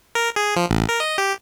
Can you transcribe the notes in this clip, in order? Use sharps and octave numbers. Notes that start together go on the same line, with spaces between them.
A#4
G#4
F3
A1
A#4
D#5
G4